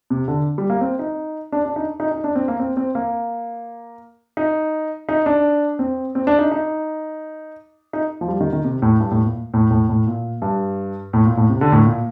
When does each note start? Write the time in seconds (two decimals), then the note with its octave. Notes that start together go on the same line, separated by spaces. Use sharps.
0.10 C3
0.28 D3
0.58 G3
0.70 A#3
0.81 C4
0.99 D#4
1.52 D4
1.65 D4
1.76 D#4
2.00 D#4
2.11 D#4
2.24 D4
2.35 C4
2.48 A#3
2.60 C4
2.77 C4
2.95 A#3
4.37 D#4
5.09 D#4
5.26 D4
5.79 C4
6.15 C4
6.27 D4
6.39 D#4
6.51 D#4
7.93 D#4
8.21 F3
8.28 G3
8.40 D#3
8.53 D#3
8.64 C3
8.82 A2
9.00 G2
9.11 A2
9.23 A#2
9.54 A2
9.71 A2
9.89 A2
10.07 A#2
10.42 G2
11.13 A2
11.25 A#2
11.37 A2
11.49 C3
11.61 D3
11.72 A2
11.85 A#2